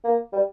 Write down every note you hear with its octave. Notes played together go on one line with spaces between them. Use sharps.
A#3
G3